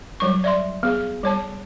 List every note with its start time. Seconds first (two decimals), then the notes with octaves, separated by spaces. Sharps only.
0.20 F#3 G3 C#6
0.44 D5 E5 C6
0.83 B3 G#4
1.23 G3 C#5 A5